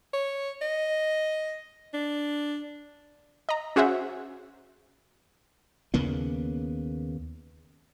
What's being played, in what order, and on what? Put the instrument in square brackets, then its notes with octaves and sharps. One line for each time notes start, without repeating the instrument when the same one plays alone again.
[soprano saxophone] C#5
D#5
D4
[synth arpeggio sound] D#5 A#5
C#4 F#4 G#4 C5 E5 F#5
[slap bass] D#2 C#3 A#3 B3